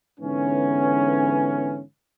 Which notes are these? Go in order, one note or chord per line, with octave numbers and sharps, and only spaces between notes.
G#2 D3 E3 B3 C#4